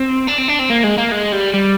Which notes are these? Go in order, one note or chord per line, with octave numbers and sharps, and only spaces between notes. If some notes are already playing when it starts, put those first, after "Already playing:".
Already playing: C4
D4
C4
D4
C4
A#3
G#3
A#3
G#3
G3
G3